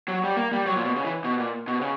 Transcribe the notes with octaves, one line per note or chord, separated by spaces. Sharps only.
F#3
G3
A#3
G3
F#3
A#2
B2
C#3
E3
B2
A#2
B2
C#3